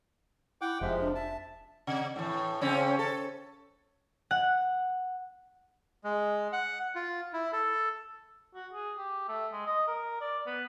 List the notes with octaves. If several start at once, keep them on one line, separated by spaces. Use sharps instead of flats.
E4 F#5 G5 D6
F1 C3 F3 G#3 E5
D4
E5 A5
C3
A2 E3
C#3 C4 C#4
A4
F#5
G#3
F#5
F4
E4
A4
F#4
G#4
G4
A3
G#3
D#5
A#4
D5
B3